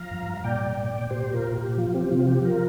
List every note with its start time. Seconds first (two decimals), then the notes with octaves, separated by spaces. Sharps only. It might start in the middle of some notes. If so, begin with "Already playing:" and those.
Already playing: F3 F5 A#5
0.11 G2
0.26 G2
0.44 A#2 D5 G5
0.60 A#2
0.77 A#2
0.94 A#2
1.10 A#2 G4 C5
1.27 A#2
1.33 F4 A#4
1.44 A#2
1.55 G4
1.61 A#2
1.77 F3 F4
1.94 C4 G4
2.11 C3 F4
2.27 F3 G4
2.45 F3 F4 A#4